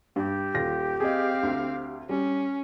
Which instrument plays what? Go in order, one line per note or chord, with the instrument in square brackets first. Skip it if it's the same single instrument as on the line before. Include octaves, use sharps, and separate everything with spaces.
[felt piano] G2 [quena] G4
[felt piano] D#1 F4 A#6
[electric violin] C4 F5 [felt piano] G#4 D#5
[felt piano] D2
[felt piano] G3 [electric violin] C#4